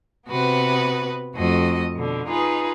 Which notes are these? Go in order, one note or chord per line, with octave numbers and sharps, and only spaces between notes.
C3 B3 F#4 B4
F2 A3 F#4 D#5
B2 D3
D#4 F4 G#4 B4